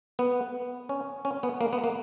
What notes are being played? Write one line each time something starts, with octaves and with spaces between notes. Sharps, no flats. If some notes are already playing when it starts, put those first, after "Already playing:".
B3
C#4
C#4
B3
A#3
B3
A#3